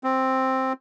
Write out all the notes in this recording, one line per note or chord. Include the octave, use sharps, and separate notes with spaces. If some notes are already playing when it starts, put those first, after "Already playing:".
C4